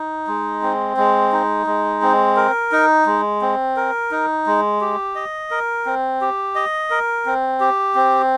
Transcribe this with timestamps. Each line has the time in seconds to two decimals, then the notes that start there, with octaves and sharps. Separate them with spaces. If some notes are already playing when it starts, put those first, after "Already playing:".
Already playing: D#4
0.27 G#3
0.62 C4
0.97 G#3
1.32 D#4
1.67 G#3
2.02 C4
2.36 A#4
2.72 D#4
3.06 G#3
3.42 C4
3.76 A#4
4.11 D#4
4.47 G#3
4.81 G4
5.15 D#5
5.51 A#4
5.86 C4
6.21 G4
6.55 D#5
6.90 A#4
7.26 C4
7.61 G4
7.95 C4